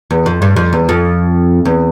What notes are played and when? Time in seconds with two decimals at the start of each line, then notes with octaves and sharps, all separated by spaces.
0.11 E2
0.26 F2
0.42 G2
0.56 F2
0.73 E2
0.89 F2
1.65 E2